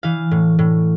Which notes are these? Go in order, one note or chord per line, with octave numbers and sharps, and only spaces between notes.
E3 F5
A2
A2